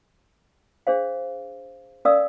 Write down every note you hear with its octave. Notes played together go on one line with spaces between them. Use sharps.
D4 G#4 C5 F5
C#4 A#4 D5 F5 D#6 E6